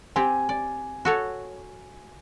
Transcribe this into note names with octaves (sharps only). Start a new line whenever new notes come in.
C4 G4 G#5
D5
F#4 A4 C#5